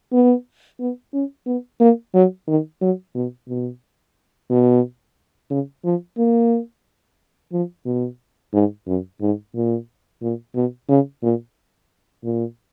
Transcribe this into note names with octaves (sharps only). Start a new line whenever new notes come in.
B3
B3
C#4
B3
A#3
F#3
D#3
F#3
B2
B2
B2
C#3
F3
A#3
F3
B2
G#2
F#2
G#2
A#2
A#2
B2
C#3
A#2
A#2